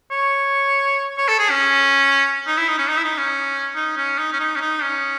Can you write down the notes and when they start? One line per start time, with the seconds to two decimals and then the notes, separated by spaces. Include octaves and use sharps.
0.11 C#5
1.18 C#5
1.28 A4
1.39 G#4
1.50 C#4
2.47 D#4
2.58 E4
2.68 D#4
2.78 C#4
2.89 D#4
2.97 E4
3.04 D#4
3.18 C#4
3.75 D#4
3.97 C#4
4.18 D#4
4.32 C#4
4.40 D#4
4.56 C#4
4.61 D#4
4.83 C#4